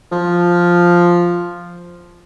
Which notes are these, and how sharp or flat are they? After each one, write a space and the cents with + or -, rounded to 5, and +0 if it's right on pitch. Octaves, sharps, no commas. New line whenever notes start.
F3 +0